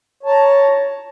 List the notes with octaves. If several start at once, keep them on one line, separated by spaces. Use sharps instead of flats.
C#5 A5 A#5